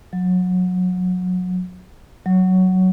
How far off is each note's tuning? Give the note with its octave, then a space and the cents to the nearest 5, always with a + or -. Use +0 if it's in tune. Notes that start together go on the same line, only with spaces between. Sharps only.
F#3 -25
F#3 +5